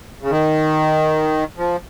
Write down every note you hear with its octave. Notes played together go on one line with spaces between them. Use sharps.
C#3
D#3
F3